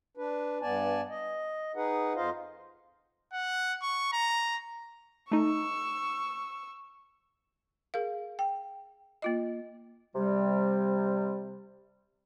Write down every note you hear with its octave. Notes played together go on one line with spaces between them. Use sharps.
D4 B4
G2 B3 D5 G#5 A5
D#5
D#4 G#4 B4 F#5
F2 F4 C5 D#5 F5
F#5
C#6
A#5
A3 D#4 C#6 E6
G#4 A#4 F5
G5
A#3 F4 D#5
C3 G3